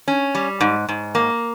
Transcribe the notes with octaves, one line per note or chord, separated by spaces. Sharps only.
C#4
G3
G#2
G#2
A#3